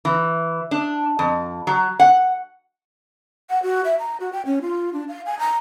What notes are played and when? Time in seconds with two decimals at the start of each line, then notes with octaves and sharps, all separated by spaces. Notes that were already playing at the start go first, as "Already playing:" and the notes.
0.05 E3
0.71 D4
1.19 F2
1.67 F#3
2.00 F#5
3.50 F#5
3.63 F#4
3.85 E5
3.99 A#5
4.20 F#4
4.33 G5
4.46 C#4
4.62 F4
4.93 D4
5.08 F5
5.26 G#5
5.39 A#5